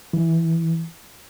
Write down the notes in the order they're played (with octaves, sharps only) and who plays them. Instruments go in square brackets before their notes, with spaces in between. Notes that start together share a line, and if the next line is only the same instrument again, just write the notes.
[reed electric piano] E3